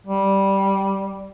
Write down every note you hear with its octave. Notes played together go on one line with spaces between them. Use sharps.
G3